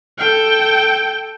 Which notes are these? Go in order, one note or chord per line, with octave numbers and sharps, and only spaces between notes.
A4 G5